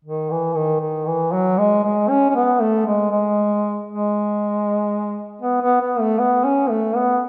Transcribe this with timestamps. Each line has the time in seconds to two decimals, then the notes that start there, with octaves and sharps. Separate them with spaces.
0.05 D#3
0.30 E3
0.56 D#3
0.81 D#3
1.07 E3
1.33 F#3
1.58 G#3
1.83 G#3
2.09 C#4
2.30 C#4
2.35 B3
2.60 A3
2.87 G#3
3.11 G#3
3.89 G#3
5.42 B3
5.62 B3
5.80 B3
6.00 A3
6.19 B3
6.44 C#4
6.70 A3
6.96 B3